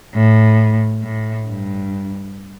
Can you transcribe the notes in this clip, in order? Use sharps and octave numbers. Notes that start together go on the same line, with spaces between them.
A2
A2
G2